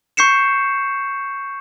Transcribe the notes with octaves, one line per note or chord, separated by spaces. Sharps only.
C#6 G6 C7 C#7 E7